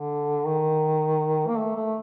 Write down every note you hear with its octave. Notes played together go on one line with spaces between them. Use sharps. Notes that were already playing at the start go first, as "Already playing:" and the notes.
Already playing: D3
D#3
A#3
A3
A3